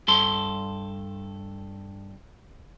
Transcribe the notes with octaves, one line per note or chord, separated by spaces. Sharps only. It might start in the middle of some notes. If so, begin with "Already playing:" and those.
G2 A4 C6